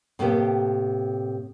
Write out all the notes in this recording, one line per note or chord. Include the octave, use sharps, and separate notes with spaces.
A2 C3 A#3 B3 G4